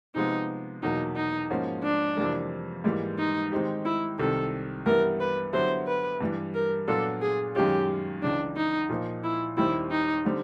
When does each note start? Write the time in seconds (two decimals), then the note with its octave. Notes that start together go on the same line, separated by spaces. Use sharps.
0.15 C3 F3 G#3 B3 D#4
0.82 E2 B2 F#3 A#3 D#4
1.16 D#4
1.50 G#2 F3 A#3 C#4 F#4
1.84 D4
2.17 F2 C3 E3 G3 A#3
2.84 G#2 E3 G3 A#3
3.18 D#4
3.52 D#3 G#3 C4 D#4 G4
3.85 E4
4.18 C2 C3 D#3 A4
4.86 G2 E3 G3 B3 E4 A#4
5.20 B4
5.53 D3 F#3 B3 E4 G4 C5
5.87 B4
6.21 G2 E3 G3
6.54 A#4
6.88 A#2 F#3 B3 D4 F4 A4
7.21 G#4
7.55 F#2 D#3 G#3 C#4 F4 G4
8.22 C#2 C#3 E3 D4
8.56 D#4
8.89 A#2 F3 A#3 D#4
9.24 E4
9.57 D#2 D#3 G3 C4 E4
9.91 D#4
10.25 D3 G3 C4